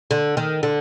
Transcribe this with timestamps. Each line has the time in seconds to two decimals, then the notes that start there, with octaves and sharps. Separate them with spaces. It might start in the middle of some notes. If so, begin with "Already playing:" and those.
0.11 D3
0.37 D#3
0.63 D3